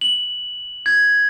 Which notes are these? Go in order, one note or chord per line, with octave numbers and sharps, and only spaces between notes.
F#7
G#6